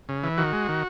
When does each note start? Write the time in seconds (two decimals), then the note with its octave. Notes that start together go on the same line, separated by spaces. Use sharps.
0.09 C#3
0.23 E3
0.38 D#3 F#4
0.53 G#3
0.69 D#3